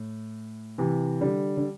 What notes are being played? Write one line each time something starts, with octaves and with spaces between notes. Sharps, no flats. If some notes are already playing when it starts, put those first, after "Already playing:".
Already playing: A2
C3 E3
D3 G3
D3